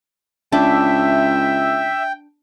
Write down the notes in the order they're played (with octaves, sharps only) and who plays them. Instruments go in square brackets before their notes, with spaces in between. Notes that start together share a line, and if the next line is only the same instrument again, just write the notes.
[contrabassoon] C#2 [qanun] D4 [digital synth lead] E5 [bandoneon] G5